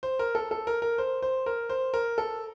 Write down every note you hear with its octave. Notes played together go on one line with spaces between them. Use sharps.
C5
A#4
A4
A4
A#4
A#4
C5
C5
A#4
C5
A#4
A4